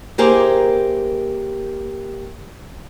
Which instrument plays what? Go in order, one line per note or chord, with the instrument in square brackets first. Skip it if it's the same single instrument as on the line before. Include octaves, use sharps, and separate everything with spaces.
[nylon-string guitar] A#3 E4 G4 G#4 A#4 C5